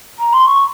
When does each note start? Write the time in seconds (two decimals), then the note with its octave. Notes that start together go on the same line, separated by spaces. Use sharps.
0.19 A#5
0.32 C6
0.46 C#6